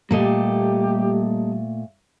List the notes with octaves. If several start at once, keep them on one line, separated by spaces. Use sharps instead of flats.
A#2 G3 A3 A#3 G4 A4 D#5